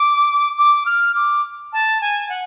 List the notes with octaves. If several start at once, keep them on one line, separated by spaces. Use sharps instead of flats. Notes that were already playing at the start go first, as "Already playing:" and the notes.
Already playing: D6
D6
F6
D6
A5
G#5
F#5